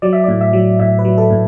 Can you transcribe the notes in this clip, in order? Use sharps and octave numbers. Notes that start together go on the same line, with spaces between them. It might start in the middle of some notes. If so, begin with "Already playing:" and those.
F#3 D5
E5
A2 D5
E5
F#3
A2 E5
B4
F#3
A4
A2